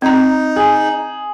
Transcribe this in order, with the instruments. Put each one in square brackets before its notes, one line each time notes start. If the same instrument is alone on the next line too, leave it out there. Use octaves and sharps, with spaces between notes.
[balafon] C4 A#5 [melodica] D#4
[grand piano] G#4